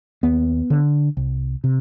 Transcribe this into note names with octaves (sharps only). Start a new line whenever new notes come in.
D#2 B3
D3
C2
C3